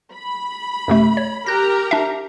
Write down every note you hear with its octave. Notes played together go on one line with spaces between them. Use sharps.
B5
F#2 C3 A3
C#5
G4 A#4 A#5 F#6 A#6
D4 E5